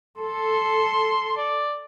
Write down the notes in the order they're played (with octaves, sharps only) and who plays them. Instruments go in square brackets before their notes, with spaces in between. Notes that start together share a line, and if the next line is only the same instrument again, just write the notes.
[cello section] A4 [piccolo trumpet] C6
[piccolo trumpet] D5